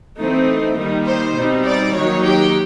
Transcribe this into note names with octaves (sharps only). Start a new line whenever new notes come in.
E3 A3 C4 D#4
D#3 G3 A#3 D#4
C5
B2 G3 C4 D#4
D5
D#3 F#3 A#3 D#4 C#5
G4